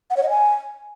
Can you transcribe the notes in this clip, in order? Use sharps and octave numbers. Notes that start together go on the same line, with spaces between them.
F#5
C#5
D#5
G#5